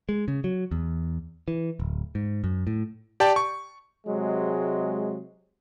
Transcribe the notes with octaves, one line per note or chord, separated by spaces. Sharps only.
G#3
C#3
F#3
E2
E3
D1
G#2
F#2
A2
G4 D5 G5 A5
C#6
C3 F#3 G#3